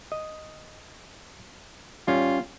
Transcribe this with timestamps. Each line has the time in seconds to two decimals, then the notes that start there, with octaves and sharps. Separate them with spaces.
0.12 D#5
2.08 G3 C#4 F4